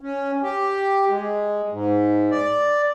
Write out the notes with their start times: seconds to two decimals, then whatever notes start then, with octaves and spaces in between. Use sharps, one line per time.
0.01 C#4
0.42 G4
1.10 G#3
1.72 G#2
2.31 D5